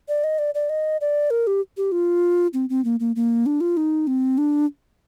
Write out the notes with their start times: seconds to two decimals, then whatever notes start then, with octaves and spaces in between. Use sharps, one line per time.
0.08 D5
0.24 D#5
0.39 D5
0.55 D5
0.69 D#5
1.01 D5
1.31 A#4
1.47 G4
1.77 G4
1.92 F4
2.54 C4
2.70 C4
2.85 A#3
3.00 A#3
3.16 A#3
3.46 D4
3.61 F4
3.77 D#4
4.07 C4
4.38 D4